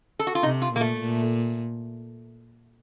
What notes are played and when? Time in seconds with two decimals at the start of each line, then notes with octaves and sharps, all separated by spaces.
0.19 A4
0.27 F#4
0.35 F4
0.43 C3 D#4
0.62 F4
0.72 A#2 A#3
0.81 A3
1.00 A#2